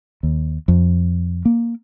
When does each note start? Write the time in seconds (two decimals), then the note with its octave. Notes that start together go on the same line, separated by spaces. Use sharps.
0.23 D#2
0.68 F2
1.45 A#3